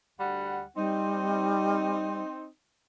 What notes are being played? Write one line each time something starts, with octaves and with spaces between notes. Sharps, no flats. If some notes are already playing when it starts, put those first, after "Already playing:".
D2 G3 F#5
G3 C4 D#4